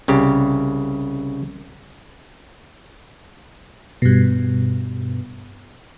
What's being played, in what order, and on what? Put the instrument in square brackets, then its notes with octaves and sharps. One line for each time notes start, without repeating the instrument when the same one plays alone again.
[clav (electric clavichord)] C2 C#3 G4
[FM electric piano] G2 B2